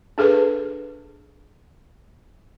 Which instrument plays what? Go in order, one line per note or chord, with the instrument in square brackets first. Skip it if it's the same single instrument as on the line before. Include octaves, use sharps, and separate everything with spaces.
[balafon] D4 G#4 A4 B4